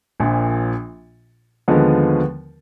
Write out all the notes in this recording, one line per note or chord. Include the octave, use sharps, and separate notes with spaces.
A#1 A#2 F3
D#2 D3 F3 G#3 B3